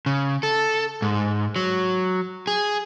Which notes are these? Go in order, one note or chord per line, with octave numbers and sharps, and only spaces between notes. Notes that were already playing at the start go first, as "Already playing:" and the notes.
C#3
A4
G#2
F#3
G#4